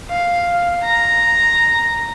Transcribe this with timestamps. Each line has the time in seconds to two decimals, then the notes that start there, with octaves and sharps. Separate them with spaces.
0.11 F5
0.84 A#5